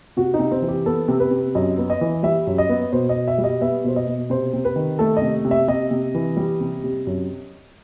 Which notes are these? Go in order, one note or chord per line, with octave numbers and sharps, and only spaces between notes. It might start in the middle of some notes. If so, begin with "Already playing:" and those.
C3 F#4
D#4
C3
C4
E3
G4
B3 A4
C3
B4
C3
F#2 D#5
B3
D#5
E3
G3 E5
F#2
D#5
B3
B2 C5
D#5
B2
E5
G3
D#5
B3 E5
B2 C5
D#5
B2
C3 C5
C3
B4
D#3
A3 A4
D#5
C3
C3
E5
C3 D#5
C3
E3
G3
C3
C3
F#2